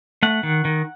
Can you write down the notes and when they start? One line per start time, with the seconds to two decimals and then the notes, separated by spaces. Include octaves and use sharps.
0.23 A3 F#5
0.43 D#3
0.65 D#3